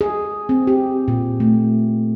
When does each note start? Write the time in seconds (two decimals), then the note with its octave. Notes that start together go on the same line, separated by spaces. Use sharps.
0.01 G#4
0.49 C4
0.67 G4
1.08 A#2
1.40 A3